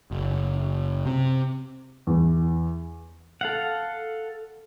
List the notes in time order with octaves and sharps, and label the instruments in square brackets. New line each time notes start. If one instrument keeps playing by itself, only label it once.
[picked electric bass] F#1
C3
[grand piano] E2
[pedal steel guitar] A4 F5 F#5